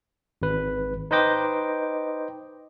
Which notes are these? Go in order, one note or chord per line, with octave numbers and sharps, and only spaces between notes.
G#1 B4
D#4 B4 C5 D#5 G5 D6